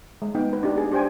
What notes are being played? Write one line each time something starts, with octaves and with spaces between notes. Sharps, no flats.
G#3
B3 D#4 G5
A#3 B4
D4 D#4 G4
G#4
D4 G4 C5 G5 G#5